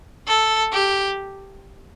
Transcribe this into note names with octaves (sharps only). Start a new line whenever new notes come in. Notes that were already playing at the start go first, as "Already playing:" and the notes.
A4
G4